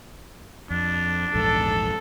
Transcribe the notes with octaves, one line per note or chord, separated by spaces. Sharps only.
F2 D4
A#1 E2 G#2 A4